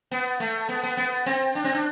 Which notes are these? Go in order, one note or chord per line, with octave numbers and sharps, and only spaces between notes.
B3
A3
B3
B3
B3
C4
D4
C4
D4